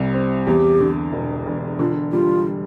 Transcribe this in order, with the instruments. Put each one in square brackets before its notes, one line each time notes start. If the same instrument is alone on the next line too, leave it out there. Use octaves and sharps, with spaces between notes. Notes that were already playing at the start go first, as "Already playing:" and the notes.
Already playing: [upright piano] C2 C3 G3
C4
[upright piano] E2 [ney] G4
[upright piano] D3
E1
E1
[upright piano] D3 [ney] F4
[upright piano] G3 [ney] F4